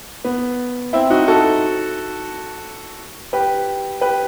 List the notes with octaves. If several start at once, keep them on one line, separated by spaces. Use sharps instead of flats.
B3
C4 E4
D#4 F#4
F#4 A4
G4 B4
G4 B4